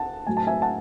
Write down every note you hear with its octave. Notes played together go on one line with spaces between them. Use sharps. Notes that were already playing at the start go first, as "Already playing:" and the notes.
Already playing: F#5 A5
A2 F#3 G#5
A5
E5 G#5
F#5 A5